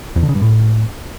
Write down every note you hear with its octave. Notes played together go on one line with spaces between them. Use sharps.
E2
D3
C#3
G2
A2